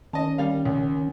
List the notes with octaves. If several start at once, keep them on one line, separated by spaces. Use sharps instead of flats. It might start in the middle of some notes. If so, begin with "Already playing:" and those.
D#3 C#4 D#5 A5
G3 F5
C#2